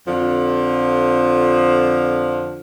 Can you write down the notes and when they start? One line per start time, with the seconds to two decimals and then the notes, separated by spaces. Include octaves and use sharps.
0.08 F2 D3 F3